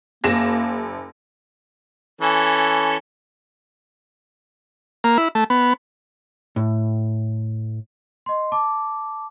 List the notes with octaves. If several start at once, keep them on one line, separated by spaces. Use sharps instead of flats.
F#1 A#3 A#6 E7
E3 C#4 A4
A#3
E4
A3
B3
A2
D#5 C6
A5 D6